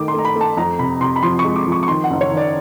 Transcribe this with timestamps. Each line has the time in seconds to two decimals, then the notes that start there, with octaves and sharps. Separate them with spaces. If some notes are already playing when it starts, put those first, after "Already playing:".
Already playing: D#3 A3 D6
0.08 C6
0.14 A3 A#5
0.25 B5
0.36 A3
0.41 A5
0.57 F2 A#5
0.79 C3 B5
1.01 C3 C6
1.16 B5
1.23 F3 C6
1.39 C#6
1.44 G#3
1.56 D6
1.66 F3
1.72 C#6
1.83 C#6
1.88 D#3 C6
2.04 F#5
2.10 F#1
2.21 C#5
2.32 D#3
2.37 D5